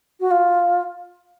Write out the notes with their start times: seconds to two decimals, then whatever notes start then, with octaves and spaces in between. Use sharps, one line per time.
0.20 F#4
0.31 F4